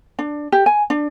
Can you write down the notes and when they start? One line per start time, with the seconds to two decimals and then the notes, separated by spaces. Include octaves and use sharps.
0.19 D4
0.52 G4
0.66 G#5
0.90 D4